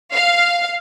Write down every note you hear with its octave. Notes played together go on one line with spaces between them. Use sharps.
F5